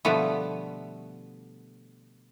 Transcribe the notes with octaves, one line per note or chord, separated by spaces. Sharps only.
B2 D3 F3 G3 A3 B3